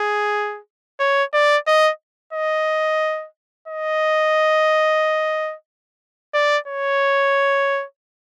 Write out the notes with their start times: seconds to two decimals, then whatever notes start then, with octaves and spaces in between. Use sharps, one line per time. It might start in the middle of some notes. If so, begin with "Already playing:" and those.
Already playing: G#4
1.00 C#5
1.34 D5
1.67 D#5
2.33 D#5
3.68 D#5
6.34 D5
6.68 C#5